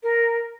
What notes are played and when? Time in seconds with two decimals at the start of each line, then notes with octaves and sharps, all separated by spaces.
0.03 A#4